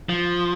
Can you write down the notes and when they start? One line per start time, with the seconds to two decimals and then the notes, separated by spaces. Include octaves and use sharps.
0.09 F3